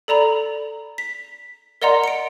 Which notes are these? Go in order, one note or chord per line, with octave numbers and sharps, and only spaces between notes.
A4 D5 A#5 B5
B6
A#4 D5 D#5 F#5 A#5 C6
C#7 D7